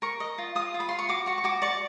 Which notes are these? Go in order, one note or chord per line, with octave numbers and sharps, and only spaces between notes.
A#4 C#6
D#5
F4
F4 D#6
F4
B5
F4 C6
C#6
F#4 D6
F#4 C#6
C#6
F#4 D6
D5 C#6